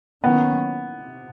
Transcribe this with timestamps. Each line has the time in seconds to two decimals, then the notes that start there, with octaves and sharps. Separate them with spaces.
0.24 D#3 F#3 A#3 B3 C#4
1.01 C3